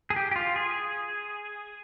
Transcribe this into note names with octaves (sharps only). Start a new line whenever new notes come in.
G#4
G4
G4
F4
G#4